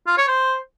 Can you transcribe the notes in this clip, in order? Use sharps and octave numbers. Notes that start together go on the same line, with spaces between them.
F4
C#5
C5